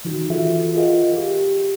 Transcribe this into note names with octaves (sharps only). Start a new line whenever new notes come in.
D#3 E3 D#4 F#4
E3 F4 F#4 G#4 A4 E5
F4 G#4 A#4 D#5 F5 F#5
G4